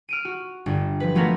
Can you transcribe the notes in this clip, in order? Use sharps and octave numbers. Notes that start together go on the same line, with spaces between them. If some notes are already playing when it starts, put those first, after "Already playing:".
F6 D7 D#7
F#4
G1
F3 B4
F3 F#3 A3 B3 A#4